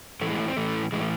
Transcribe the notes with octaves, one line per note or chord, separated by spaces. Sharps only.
A2 E3 A3
G#3
A3
C4
A2 E3 A3
A2 E3 G#3
A3